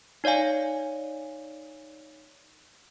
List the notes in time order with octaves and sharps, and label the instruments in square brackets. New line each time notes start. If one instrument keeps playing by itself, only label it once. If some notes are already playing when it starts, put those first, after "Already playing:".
[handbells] D#4 C#5 D5 F5 G#5